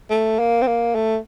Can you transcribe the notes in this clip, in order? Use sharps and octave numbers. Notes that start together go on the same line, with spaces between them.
A3
A#3
C4
A#3
A3